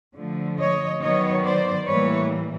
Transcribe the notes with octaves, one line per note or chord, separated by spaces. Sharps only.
D3 F3 A3
C#5 D#5
D#3 F#3 B3 C#5 D#5
C5 D5
A2 E3 G3 A#3 B4 C#5